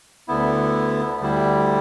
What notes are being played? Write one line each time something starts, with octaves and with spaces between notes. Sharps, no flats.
D2 D3 B3 E4
D2 D3 G3 E4